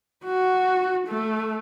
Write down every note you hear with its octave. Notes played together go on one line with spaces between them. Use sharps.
F#4
A3